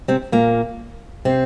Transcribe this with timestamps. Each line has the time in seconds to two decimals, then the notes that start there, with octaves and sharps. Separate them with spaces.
0.08 C3 C4
0.32 A#2 A#3
1.25 C3 C4